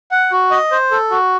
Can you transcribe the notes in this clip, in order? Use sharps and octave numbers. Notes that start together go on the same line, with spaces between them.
F#5
F#4
D#5
C5
A4
F#4